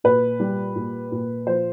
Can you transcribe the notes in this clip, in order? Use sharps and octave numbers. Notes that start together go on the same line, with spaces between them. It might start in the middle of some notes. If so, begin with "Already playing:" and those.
A#2 B4
G3
A#2
A#2
F3 C5